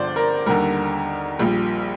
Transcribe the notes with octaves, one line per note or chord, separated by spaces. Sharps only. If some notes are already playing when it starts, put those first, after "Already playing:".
Already playing: G1 G2 D3 F3 C5 D5
A#4
D#2 D3 G3 A#4
A#1 A#2 G3